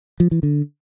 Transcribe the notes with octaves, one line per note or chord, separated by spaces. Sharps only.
F3
E3
D3